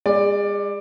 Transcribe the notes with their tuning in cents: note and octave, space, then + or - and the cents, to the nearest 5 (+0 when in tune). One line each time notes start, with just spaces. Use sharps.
G#3 -35 D5 +15